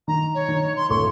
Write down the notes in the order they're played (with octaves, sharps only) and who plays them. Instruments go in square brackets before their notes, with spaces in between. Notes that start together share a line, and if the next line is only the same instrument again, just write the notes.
[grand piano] D#3 [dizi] A#5
[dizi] C#5
[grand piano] D#3
[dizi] C6
[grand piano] D1 A3 C#6 [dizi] C6